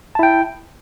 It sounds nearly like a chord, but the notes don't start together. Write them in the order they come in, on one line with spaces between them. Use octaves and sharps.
A5 E4 G5